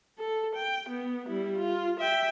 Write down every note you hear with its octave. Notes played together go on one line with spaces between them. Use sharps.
A4
G5
B3
G3 E4
F4
E5 G5